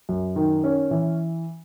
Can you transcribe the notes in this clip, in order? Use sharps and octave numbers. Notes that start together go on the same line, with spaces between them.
F#2
D#3
C#4
E3